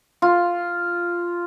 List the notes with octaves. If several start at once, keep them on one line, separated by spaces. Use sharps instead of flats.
F4